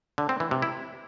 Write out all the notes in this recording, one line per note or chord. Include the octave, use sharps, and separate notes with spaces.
D3
C4
E3
C3
E4